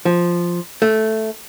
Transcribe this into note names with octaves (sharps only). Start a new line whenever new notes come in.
F3
A3